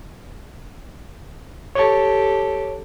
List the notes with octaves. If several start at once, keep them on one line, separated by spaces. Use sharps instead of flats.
G4 A4 C#5 A5